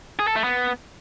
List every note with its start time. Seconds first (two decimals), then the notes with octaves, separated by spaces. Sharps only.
0.19 G#4
0.27 A4
0.36 A3
0.44 B3